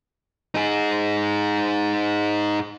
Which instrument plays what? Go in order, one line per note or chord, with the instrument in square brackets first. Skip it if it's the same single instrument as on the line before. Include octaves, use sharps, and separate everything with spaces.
[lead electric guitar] D#4 G#4